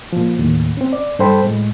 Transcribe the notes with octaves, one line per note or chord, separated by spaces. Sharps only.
A#2 F3
D#2 A2
C4 C#4
D5
G2 A4 C5 G5 B5
A2 G#3